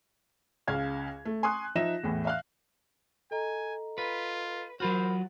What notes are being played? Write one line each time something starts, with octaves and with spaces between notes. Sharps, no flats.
C#2 C#3 F5 G#6
A3
G#5 C6 C#6 D#6 F#6
F3 D#4 E5 A#6 E7
E2 A2 E3
E5 F5 F#6
A4 D#5 G#5 A#5
F4 B4
F#3 F4 F#4 A#4 C5 B5 F6